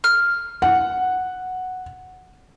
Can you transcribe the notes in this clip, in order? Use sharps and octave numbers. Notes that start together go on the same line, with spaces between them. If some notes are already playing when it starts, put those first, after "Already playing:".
F6
F#5